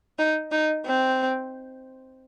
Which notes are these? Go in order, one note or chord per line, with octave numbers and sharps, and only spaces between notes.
D#4
D#4
C4